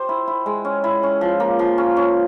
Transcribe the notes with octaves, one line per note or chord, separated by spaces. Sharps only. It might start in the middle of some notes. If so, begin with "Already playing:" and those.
Already playing: G4 C5
E4
E4
G#3
C#4
E4
C#4
F3
A#3
F3
C#4
C#4